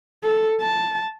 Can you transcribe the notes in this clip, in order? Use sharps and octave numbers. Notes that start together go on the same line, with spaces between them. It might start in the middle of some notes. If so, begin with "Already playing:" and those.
A4
A5